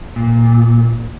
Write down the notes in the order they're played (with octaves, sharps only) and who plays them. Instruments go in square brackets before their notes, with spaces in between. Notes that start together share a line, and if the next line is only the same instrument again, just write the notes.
[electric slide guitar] A#2